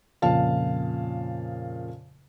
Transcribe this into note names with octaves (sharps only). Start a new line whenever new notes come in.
F2 A#2 C#3 F5 A5